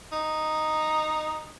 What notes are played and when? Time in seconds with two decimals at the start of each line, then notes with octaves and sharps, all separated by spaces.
0.12 D#4